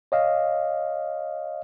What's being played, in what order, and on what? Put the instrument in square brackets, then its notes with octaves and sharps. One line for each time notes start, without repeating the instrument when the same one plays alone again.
[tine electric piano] C#5 D#5 F5